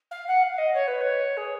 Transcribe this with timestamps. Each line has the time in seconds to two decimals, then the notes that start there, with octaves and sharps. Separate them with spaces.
0.11 F5
0.28 F#5
0.43 F5
0.58 D#5
0.74 C#5
0.87 B4
1.01 C#5
1.37 G#4